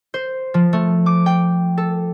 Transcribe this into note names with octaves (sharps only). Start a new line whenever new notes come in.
C5
F3
A3
D6
G5
A4